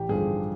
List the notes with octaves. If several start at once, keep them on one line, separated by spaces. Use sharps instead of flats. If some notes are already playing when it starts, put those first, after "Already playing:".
Already playing: A1 G4
G2 D3 F3 G#4